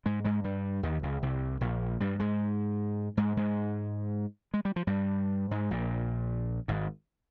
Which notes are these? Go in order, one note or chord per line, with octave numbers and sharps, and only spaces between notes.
G#2 G#3
G#2 G#3
G2 G3
D#2 D#3
C#2 C#3
C2 C3
A#1 A#2
G2 G3
G#2 G#3
G#2 G#3
G#2 G#3
G#3
G3
F3
G2 G3
G#2 G#3
A#1 A#2
G#1 G#2